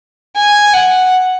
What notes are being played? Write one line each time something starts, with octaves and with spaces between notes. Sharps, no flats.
G#5
F#5